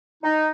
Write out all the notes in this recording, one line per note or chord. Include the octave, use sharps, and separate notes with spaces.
D#4